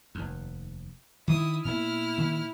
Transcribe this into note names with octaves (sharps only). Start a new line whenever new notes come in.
F1 D#2
D#3 E4 D#6
A#2 A#3 B3 E4 F6
A#2 D#3 A#3